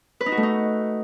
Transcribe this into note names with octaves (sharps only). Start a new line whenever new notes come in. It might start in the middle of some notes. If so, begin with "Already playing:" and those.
B4
D#4
F#4
A3
D#4